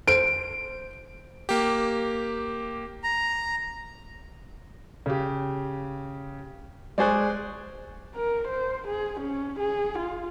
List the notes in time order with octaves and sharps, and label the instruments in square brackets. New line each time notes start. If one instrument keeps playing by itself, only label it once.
[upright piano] C5 D7
[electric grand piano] A#3 G4
[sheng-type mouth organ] A#5
[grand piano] C#3 G4
[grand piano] G#3 C#6 F#6 [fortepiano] G#4 C5 D5
[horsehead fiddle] A#4
C5
G#4
C#4
G#4
F4